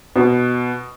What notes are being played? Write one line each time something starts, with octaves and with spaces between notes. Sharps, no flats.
B2